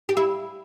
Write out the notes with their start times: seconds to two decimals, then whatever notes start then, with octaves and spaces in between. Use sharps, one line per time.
0.09 G4
0.17 E4